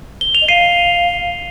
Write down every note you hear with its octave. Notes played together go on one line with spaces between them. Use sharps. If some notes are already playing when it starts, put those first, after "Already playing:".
G7
F7
D#5
F5 C7 D#7